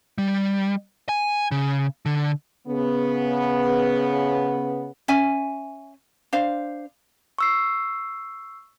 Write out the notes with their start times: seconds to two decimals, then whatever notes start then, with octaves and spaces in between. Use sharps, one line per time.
0.18 G3
1.09 G#5
1.51 C#3
2.06 D3
2.67 C#3 B3
5.08 C#4 E5 G#5
6.33 D4 C5 F5
7.39 C#6 E6 C7